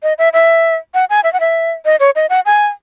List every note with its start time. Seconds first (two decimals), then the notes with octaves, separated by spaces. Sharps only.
0.03 D#5
0.18 E5
0.33 E5
0.94 F#5
1.10 G#5
1.24 E5
1.33 F#5
1.40 E5
1.85 D#5
2.00 C#5
2.16 D#5
2.30 F#5
2.46 G#5